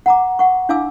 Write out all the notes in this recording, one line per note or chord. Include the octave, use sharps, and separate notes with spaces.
F#5 A#5 D6
F#5 C#6
D4 E4 F5 G#5 D6 E6